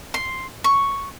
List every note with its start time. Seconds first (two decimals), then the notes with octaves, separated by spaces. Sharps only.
0.14 C6
0.64 C#6